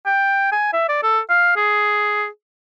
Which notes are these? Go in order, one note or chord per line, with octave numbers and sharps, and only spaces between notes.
G5
G#5
E5
D5
A4
F5
G#4